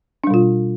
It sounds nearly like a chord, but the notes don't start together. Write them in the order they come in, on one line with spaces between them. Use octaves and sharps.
D4 G3 B2 F4